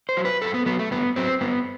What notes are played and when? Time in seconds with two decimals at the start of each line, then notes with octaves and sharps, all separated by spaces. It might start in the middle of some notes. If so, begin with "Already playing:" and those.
0.09 C5
0.17 F#3
0.25 B4
0.42 F#2 A4
0.54 B3
0.66 F#3 B3
0.79 A3
0.91 G2 B3
1.16 F#3 C4
1.41 G2 B3